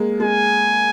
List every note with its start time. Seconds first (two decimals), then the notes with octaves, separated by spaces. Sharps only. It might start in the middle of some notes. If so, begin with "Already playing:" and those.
Already playing: G#3 A#3
0.20 G#3 G#5